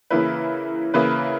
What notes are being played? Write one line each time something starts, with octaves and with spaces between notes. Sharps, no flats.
C#3 E3 A#3 E4 B4
C#3 E3 A#3 E4 B4